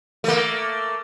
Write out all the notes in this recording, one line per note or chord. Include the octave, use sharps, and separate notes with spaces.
A3 A#3